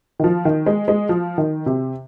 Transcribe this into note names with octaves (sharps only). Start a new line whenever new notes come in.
D#3
F3
D#3
G#3
G#3
F3
D#3
C3